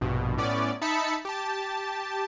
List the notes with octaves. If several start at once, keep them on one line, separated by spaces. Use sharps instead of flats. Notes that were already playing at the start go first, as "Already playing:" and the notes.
A#1 G2 B2
A2 B3 C#4 D5
D#4 E5 A5 B5 B6 C#7
G4 A5